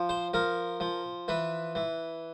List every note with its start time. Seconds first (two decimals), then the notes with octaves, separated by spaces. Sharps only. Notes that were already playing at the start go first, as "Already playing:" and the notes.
Already playing: F3
0.09 C5
0.34 F3 A#4
0.80 F3
1.28 E3 B4
1.75 E3